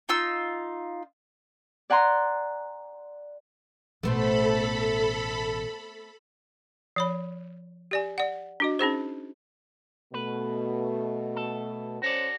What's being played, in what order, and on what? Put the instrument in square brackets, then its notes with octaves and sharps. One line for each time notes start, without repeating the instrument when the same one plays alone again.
[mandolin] D#4 F4 E6
[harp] D5 F#5 G#5 A#5 C6
[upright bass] A1 B2 [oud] A3 B3 C4 [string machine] A4 B5
[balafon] F3 C#5 B5
G4 D5 G#5
D5 F#5
D4 F#4 D#5
C#4 D#4 G#4 C5
[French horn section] B2 A3 [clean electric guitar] B4
[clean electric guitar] A4
[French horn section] C#4 C5 [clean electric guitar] F#4 A4 D5